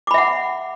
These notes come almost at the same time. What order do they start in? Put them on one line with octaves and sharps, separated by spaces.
D6 B5 E5 F#5